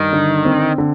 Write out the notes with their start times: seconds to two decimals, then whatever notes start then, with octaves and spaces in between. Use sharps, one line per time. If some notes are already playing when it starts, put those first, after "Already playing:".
Already playing: G2 D#3
0.13 D3
0.45 C4
0.78 D3